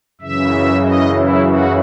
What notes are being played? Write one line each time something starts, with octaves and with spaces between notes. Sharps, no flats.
F#2 C#3 E3 E5
D#5
E4
F#4